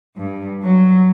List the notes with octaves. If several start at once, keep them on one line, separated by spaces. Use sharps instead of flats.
G2
F#3